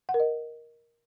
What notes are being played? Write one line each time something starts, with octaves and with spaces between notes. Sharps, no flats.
F#5
A#4
D#5